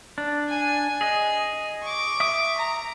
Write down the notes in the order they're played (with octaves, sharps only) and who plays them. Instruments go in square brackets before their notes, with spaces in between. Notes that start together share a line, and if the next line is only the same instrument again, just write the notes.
[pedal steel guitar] D4
[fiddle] G#5
[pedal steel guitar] G#4 D#5
[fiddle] C#6 D6
[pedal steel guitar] E5 D#6
[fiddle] A#5